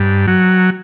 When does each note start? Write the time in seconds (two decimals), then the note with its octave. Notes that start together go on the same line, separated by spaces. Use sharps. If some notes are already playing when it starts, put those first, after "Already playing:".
Already playing: G2
0.27 F#3